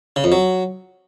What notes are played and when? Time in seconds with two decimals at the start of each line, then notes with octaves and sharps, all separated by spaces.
0.16 C#3
0.24 F2
0.32 F#3